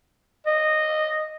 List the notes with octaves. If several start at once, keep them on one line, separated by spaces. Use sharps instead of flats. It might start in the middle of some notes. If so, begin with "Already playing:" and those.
D#5